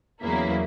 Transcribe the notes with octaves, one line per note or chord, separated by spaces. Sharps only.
E2 C#3 F#3 A#3 E4